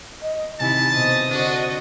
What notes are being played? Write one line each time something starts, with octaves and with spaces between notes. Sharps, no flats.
D#5
C3 D#3 E4 G#5 A5
B2 C5 D#5
D3 D4 F#4